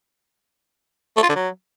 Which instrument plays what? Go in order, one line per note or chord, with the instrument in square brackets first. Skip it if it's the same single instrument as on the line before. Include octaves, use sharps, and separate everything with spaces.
[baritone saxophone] A3
F4
D3
F#3